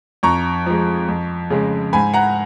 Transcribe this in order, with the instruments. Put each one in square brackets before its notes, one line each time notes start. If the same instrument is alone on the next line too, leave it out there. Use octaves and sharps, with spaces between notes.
[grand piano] F2 A#5 C#6
F3 G#3
F2
C#3 G#3
G#2 G#5 B5
F#5 A#5